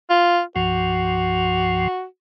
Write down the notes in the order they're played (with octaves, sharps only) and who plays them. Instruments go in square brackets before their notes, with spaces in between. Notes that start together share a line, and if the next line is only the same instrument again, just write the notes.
[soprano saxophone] F4
[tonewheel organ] C2 G2 F3 [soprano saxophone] F#4